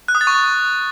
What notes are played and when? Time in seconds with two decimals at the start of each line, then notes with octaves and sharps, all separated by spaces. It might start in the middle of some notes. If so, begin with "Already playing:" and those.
0.08 F#6
0.15 D#6
0.21 A6
0.27 C#6